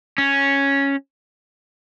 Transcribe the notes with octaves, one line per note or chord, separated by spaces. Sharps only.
C#4